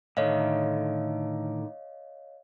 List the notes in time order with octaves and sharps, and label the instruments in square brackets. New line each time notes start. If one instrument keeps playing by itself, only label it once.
[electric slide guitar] A2 D3 D#3 [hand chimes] C#5 D#5 F5